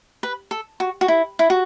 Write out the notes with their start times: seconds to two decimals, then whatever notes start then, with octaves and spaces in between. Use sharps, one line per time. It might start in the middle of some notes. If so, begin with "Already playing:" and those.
0.23 B4
0.51 A4
0.80 F#4
1.01 F#4
1.08 E4
1.39 E4
1.50 F#4